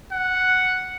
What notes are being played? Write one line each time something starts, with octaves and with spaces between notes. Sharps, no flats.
F#5